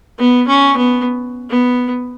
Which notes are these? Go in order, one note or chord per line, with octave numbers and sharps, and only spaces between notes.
B3
C#4
B3
B3